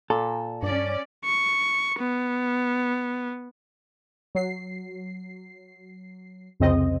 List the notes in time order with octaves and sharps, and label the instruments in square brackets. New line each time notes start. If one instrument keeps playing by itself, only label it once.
[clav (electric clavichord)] A#2 [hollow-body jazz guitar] A4
[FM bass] G2 [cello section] C#4 D5
[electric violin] C#6
B3
[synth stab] F#3 C7
C2 F2 C#3 C4 D#5